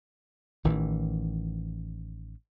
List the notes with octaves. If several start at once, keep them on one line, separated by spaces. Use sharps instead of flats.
A1 D#3 E3